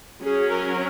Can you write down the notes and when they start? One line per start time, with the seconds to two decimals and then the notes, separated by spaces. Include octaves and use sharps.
0.22 F#3 C#4 G#4
0.51 A#4